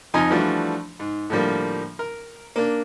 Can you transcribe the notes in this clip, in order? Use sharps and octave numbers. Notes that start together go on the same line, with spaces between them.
F2 F3 D#4 D#5 G#5 A#5
E3 F3 G3 A3 D4 F#4
G#2
A2 D3 F3 G3 A#3
A#4
A#3 D4